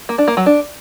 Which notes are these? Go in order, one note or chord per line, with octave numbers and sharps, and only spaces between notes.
A#3
D4
A#3
F#3
D4